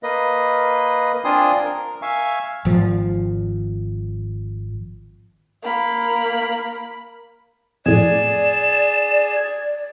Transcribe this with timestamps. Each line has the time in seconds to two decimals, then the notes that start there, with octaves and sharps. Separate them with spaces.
0.03 A#3 B4 D#5
1.25 C4 D4 F4 G#5 C6 D#6
1.64 A#4
2.02 E5 F5 G#5 C#6
2.65 G#1 F3
5.63 A#3 B5
7.86 F2 A2 G#4 D5 E7